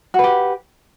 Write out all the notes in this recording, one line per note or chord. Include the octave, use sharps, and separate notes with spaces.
F#4 G4 B4